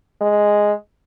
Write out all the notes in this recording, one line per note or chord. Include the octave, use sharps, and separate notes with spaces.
G#3